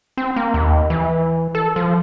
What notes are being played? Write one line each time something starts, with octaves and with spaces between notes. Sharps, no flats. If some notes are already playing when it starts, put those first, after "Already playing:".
C4
A#3
D#2
E3
A4
F3